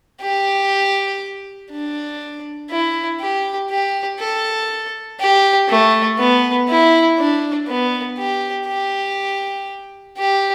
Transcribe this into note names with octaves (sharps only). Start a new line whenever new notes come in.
G4
D4
E4
G4
G4
A4
G4
A3
B3
E4
D4
B3
G4
G4
G4